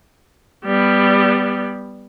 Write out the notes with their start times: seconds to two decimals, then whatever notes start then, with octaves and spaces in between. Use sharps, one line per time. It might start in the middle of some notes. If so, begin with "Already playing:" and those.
0.65 G3 B3